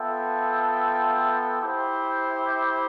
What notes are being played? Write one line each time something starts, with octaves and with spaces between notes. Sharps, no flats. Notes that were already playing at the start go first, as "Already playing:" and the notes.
Already playing: B3 F4 A4 E5 G5
E4 G4 C5